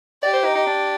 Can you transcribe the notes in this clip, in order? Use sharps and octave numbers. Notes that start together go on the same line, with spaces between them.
G4 D5
C5
D#4
D#4
D4